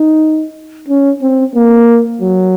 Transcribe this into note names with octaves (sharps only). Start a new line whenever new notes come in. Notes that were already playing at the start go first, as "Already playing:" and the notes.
Already playing: D#4
C#4
C4
A#3
F#3